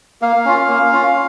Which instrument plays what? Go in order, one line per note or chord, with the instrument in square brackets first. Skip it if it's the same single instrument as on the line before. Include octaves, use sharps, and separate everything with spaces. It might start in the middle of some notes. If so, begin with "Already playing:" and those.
[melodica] A#3 F5
C#4 F4
A#3
C#4 F4